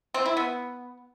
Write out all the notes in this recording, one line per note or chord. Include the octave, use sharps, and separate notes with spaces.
C4
E4
B3